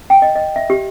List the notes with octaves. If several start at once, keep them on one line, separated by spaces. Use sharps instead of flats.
G5
D#5
D#5
E5
G4